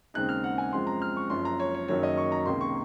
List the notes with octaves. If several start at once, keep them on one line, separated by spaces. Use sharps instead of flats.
D#2 C#3 G#3 C4 D#4 F#6
F6
F#5
G#5
F#2 F3 G#3 C4 C6
A#5
F6
C#6
F#1 F#2 F3 C6
A#5
C#5
C#5
F#1 F#2 D#3 F#3 C#5
D#5
C#6
A#5
C#2 C3 D#3 A#3 D#4 C6
C#6